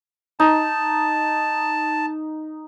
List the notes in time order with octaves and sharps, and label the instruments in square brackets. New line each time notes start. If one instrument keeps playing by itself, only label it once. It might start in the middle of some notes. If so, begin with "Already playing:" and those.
[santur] D#4 [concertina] A5